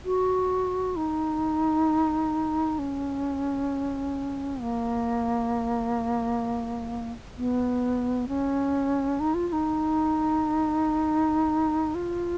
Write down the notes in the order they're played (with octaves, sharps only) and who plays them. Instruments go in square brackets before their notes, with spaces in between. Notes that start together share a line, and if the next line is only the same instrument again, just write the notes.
[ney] F#4
D#4
C#4
A#3
B3
C#4
D#4
F4
F4
D#4
F4